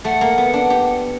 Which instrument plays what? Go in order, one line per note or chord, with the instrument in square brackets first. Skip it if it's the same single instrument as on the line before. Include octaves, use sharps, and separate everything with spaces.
[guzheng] A3 [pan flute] F#5
[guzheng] A#3
B3
D4
G4